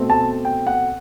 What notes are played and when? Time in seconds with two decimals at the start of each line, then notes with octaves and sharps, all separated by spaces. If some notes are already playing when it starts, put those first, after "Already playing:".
Already playing: B2 A3 C4
0.10 A5
0.45 G5
0.67 F#5